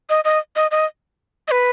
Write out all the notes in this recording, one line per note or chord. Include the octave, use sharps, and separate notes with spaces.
D#5
D#5
D#5
D#5
D#5
B4